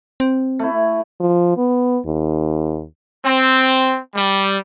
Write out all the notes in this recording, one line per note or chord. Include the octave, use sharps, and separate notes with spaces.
C4
A3 E4
F3
B3
D#2
C4
G3